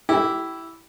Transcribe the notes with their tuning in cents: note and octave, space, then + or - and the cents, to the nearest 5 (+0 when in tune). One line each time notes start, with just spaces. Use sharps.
E4 +0 G4 -20